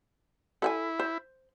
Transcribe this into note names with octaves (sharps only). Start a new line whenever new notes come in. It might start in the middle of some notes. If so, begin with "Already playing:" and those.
E4 A4 F#5 G#5
C5